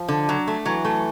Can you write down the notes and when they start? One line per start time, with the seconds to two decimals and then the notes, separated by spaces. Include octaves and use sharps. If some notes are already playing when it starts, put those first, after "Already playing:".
Already playing: F3
0.08 D3
0.29 F#3
0.47 A3
0.65 E3 F#3
0.85 A3